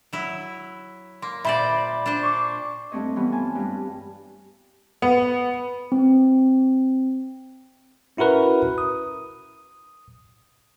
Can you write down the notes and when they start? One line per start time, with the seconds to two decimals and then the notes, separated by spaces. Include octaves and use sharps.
0.13 F#3 E4
1.22 A#3 C6
1.45 A#2 C5 D5 E5 B5
2.06 D4 C5
2.23 C#6 D6
2.92 G2 A3 C4 C#5 D#5
3.16 E3 G3 A3 B3
3.32 F4 G#5 A5
3.55 G2 G3
5.02 B3
5.92 C4
8.17 C#4 E4 F#4 A#4 B4
8.78 D#6